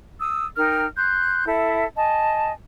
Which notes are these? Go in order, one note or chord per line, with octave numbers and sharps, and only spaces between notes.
D#6 E6
D#4 A#4 G5 F6
C6 F#6 G6
E4 A4 E5
D#5 G#5 A5